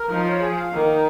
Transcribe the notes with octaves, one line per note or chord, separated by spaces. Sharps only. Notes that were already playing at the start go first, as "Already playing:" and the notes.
Already playing: A#4
F3 D#4
C#5
G#4
F5
D#3 A#3
D#4